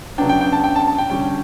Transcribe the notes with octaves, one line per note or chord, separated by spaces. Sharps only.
C#3 F#3 B3 D4 G5
G5
G5
A5
G5
A5
A5
G5
D3 G3 C#4 G5